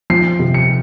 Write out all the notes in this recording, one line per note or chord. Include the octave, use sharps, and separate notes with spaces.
F3 C7
C3
C#7